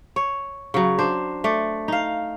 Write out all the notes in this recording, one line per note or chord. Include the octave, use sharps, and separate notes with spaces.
C#5
C#3 F#3
D4 C5
A3 D5
D#4 F5